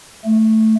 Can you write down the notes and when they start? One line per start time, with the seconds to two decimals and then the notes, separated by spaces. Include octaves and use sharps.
0.25 A3